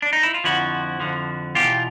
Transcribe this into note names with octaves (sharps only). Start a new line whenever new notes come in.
D4
D#4
E4
F4
F2 D3 F3 E4 F#4
F2 D3 F3
E2 B2 F4 G4